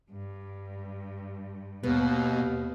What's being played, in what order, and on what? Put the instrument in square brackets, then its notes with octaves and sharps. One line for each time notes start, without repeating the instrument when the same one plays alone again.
[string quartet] G2
[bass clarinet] D#2 [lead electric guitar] B2 [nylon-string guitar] B3